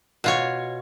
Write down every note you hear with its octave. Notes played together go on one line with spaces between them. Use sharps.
B2 F4 C#5